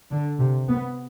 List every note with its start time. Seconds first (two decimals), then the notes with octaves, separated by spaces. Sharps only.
0.11 D3
0.38 C3
0.68 B3